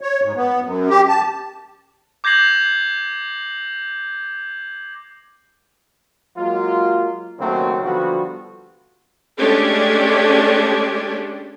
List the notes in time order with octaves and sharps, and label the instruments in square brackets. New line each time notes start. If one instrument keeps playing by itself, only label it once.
[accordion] C#5
G#2
B3
F#2
G4
A5
[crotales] D6 G6 G#6 A#6 C7 F#7
[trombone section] F#3 G#3 A#3 F4
D#2 C#3 F#3 A3 A#3 C4
D3 F3 G3 B3 F#4
[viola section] G#3 A3 C#4 D4 G4